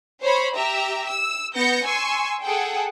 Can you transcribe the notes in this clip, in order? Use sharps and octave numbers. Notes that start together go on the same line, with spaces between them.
C5 C#5 B5
G4 E5 A#5
E6
B3 G6 A#6 C#7
G#5 C6 C#6 E6
G#4 A4 F#5 G5